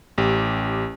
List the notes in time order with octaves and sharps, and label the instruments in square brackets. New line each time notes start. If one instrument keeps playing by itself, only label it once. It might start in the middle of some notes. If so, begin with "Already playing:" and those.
[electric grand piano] A1 G4